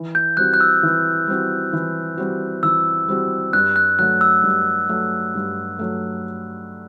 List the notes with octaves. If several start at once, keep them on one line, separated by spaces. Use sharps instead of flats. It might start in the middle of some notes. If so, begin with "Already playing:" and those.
Already playing: E3
G6
G3 C4 F#4 F#6
F#6
E6
E3
G3 C4 F#4
E3
G3 C4 F#4
E3 E6
G3 C4 F#4
G2 F#6
F#6
F#3 A3 F#6
E6
G2
F#3 A3
G2
F#3 A3